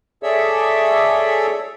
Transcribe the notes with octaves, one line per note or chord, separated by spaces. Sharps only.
G#4 A4 C#5 D5 E5 E6